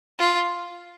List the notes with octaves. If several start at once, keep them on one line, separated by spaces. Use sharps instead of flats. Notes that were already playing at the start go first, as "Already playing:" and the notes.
F4